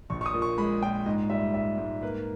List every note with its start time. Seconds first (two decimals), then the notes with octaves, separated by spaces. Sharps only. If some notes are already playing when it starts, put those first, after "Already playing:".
0.10 A#1 C#6
0.21 C#6
0.26 D#6
0.34 A#2
0.42 C#6
0.58 G#3 B5
0.82 A#2 G5
1.06 G#2 D#5
1.30 G3 E5
1.54 G3 E5
1.78 G#2
2.02 A#3 B4